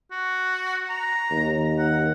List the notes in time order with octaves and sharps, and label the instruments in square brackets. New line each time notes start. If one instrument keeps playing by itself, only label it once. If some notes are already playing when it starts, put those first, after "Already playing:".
[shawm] F#4
A#5
[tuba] D#2
[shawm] F#5